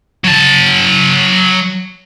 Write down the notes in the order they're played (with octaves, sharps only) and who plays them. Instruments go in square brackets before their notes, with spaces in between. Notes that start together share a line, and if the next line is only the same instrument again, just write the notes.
[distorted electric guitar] F#3 A5